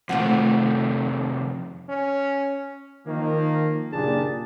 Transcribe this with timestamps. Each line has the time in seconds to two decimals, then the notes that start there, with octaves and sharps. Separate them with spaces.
0.09 F2 C3 D#3 A3 F4 F#4
1.89 C#4
3.05 D#3 F3 A#3
3.91 F#1 A#2 D4 G4 G#4 A5